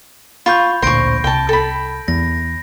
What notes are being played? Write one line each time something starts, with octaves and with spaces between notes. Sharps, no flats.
F4 B5 C#6 G6
A1 D2 A#2 C5 C#6 G6 A#6 D7
C2 G5 A5
A4 B5
E2 A#6